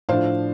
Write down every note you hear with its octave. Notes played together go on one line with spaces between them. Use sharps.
A2 F3 D4 C5 F5